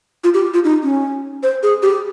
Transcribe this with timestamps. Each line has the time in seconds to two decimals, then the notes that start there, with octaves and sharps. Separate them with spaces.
0.24 F4
0.34 G4
0.54 F4
0.64 D#4
0.83 C#4
1.43 C5
1.63 G#4
1.83 G4